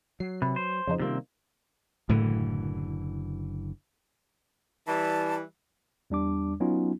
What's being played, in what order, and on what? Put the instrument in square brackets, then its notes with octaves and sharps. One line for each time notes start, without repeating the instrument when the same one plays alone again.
[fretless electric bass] F#3 [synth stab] C7
[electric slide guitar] C3 [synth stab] B4
[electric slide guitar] C5
[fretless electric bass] F2 [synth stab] C#3 F3 D#4
[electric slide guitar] C3 C4 [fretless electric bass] D#3 G3 A#3
[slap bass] F#1 D3 E3 [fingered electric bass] A2
[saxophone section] E3 G3 [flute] A5
[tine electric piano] E2 G3 D4 D6
F#3 B3 C#4 D#4 F4